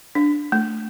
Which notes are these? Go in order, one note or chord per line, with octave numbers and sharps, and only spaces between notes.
D4
A3